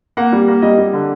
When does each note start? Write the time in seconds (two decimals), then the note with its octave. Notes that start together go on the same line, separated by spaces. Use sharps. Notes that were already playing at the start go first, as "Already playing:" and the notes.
0.17 A#3 F#5
0.32 G3
0.48 A#3
0.62 G3 D#5
0.78 G3
0.93 D3